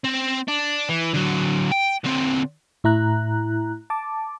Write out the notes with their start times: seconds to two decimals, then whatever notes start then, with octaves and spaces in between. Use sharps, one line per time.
0.04 C4
0.48 D4
0.89 E3
1.14 D3 F#3
1.71 G5
2.04 D3 C4
2.84 A2 E4 A#5 F#6
3.90 A5 D6